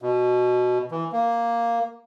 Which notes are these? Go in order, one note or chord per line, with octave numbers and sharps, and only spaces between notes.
B2
E3
A#3